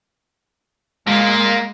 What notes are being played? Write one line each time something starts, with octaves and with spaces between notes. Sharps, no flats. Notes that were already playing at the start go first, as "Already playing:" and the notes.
G#3 A#3 F4